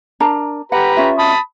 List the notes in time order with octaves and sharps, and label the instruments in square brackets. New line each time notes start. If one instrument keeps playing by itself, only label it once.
[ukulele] D4 A#4 A#5
[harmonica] G4 B4 A#5 [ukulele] F#5
[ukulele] C#4 F4 E5
[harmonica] A5 B5 D#6